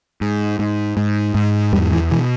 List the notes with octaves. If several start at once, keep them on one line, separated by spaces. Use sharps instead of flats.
G#2
G#2
G#2
G#2
E2 G3
E3
B2 E3